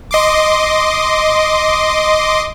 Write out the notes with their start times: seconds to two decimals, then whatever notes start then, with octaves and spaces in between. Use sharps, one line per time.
0.11 D#5 C6 D6